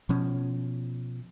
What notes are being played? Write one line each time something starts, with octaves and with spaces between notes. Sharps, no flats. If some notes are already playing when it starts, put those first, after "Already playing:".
B2 F3 C#4